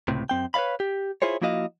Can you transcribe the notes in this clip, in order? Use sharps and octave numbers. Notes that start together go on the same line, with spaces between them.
C#2 A2 C3
F#2 C4 G5
B4 C#5 D5 F5 B5
G4
E4 F4 G#4 C5 C#5
F3 A#3 E4 F#4 D#5 F5